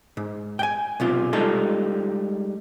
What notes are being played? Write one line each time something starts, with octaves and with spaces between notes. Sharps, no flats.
G#2
G5 G#5
B1 C3 F4
G3 G#3 D#4 F4 A4